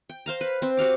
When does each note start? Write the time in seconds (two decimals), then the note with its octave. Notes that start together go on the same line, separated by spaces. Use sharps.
0.09 G5
0.26 C5 F5 A#5
0.41 B4
0.62 C4 C5
0.77 F#4 G4 F5 D6